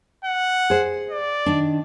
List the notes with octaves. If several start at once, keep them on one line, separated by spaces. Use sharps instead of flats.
F#5
G#4 C5
D5
D#3 D4